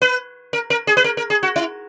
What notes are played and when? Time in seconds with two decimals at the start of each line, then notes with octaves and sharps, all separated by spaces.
0.02 B4
0.53 A#4
0.70 A#4
0.87 G#4
0.97 B4
1.04 A#4
1.17 A#4
1.30 G#4
1.43 F#4
1.56 E4